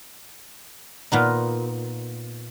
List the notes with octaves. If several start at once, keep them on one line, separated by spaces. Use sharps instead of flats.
A#2 B3 D#4